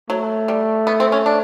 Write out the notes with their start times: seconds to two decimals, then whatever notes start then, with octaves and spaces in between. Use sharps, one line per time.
0.10 F#3 A3
0.48 G3
0.87 B3
1.00 C4
1.12 C#4
1.26 D4